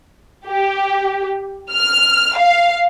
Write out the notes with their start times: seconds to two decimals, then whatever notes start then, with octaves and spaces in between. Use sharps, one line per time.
0.46 G4
1.71 F6
2.38 F5